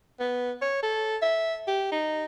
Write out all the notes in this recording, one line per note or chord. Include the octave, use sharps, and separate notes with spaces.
B3
C#5
A4
E5
G4
D#4